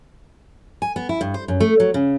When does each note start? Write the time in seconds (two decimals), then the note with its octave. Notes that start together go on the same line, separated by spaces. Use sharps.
0.82 G#5
0.96 B3
1.09 E4
1.21 G2
1.34 C5
1.48 F#2
1.60 A3
1.80 F#3
1.94 C#3